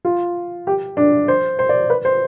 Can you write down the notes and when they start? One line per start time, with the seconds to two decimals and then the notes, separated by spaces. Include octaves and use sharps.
0.05 F4
0.67 G4
0.97 D4
1.28 C5
1.59 C5
1.69 D5
1.90 B4
2.05 C5